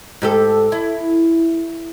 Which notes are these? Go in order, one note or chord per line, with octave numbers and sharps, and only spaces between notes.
G#2 G4 A4
E4